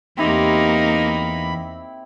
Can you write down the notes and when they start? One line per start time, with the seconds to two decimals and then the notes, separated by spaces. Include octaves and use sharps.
0.17 E2 A#3 C4 D#4 E4 G4 B5